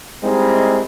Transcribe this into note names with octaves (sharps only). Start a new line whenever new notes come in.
G3 G#3 A#3 C4 D#4 E4